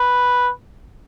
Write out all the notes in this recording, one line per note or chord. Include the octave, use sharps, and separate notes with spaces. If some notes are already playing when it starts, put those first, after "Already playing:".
Already playing: B4